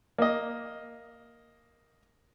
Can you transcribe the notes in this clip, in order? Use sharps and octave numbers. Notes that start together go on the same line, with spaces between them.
A#3 D#5